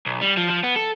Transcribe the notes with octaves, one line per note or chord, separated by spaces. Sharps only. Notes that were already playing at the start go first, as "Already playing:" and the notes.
B1
G3
F3
F3
B3
A4